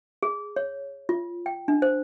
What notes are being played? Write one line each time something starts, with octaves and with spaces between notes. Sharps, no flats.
G#4
C#5
F4
G5
D4
C5